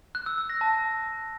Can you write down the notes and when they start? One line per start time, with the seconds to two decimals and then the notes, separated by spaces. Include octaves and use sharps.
0.15 F#6
0.26 E6
0.38 E6
0.50 A#6
0.61 A5